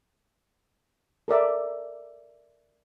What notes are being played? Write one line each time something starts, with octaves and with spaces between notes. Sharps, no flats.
A4 A#4 D5 E5